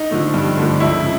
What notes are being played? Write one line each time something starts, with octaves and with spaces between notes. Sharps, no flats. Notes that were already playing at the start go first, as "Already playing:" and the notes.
Already playing: D#4
D3 F3 A3
G2
D3 F3 A3
C#2 E4
C#3